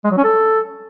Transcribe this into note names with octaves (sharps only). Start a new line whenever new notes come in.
G#3
F#3
C#4
A4